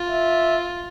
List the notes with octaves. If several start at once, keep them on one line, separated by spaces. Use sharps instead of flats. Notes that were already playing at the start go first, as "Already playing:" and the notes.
Already playing: F4
E5